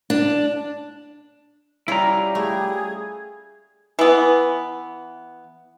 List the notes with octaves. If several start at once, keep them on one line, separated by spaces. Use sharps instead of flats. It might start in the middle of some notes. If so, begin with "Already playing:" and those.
D4
G3 C#4 E4 F4 G#4 A#5
A3 G#4
E3 B3